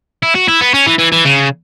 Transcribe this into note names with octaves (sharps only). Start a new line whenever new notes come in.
E4
F#4
E4
B3
C#4
E3
E3
E3
C#3